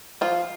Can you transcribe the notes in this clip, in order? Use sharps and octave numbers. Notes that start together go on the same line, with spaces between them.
F3 F4